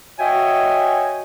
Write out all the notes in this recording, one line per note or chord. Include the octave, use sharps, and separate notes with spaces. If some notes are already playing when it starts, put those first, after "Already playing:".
F#4 C#5 D#5 E5 G5 G#5